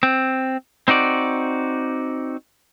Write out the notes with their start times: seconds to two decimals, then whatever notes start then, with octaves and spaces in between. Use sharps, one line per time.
0.03 C4
0.88 C4 D#4 F#4 D5